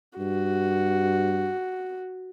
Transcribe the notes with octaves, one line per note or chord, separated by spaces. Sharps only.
G2 F#4